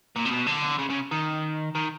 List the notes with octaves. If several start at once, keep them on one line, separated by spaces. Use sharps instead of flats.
A#2
C3
B2
D3
C#3
C#3
D#3
D#3